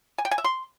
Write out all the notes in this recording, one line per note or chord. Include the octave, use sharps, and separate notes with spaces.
G#5
G5
G#5
E5
C6